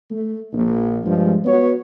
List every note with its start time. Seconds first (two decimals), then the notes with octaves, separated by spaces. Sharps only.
0.11 A3
0.53 A#1
1.05 G2 F3 G#3
1.45 B3 F#4 B4 C#5